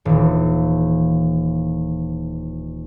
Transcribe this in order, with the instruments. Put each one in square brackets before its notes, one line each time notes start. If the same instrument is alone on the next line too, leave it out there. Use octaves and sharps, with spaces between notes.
[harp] D#1 E3